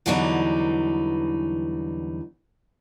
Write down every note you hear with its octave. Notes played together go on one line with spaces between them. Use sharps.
E2 D3 E3 F#3 G3 D#4